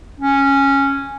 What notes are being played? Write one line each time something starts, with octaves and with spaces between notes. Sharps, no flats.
C#4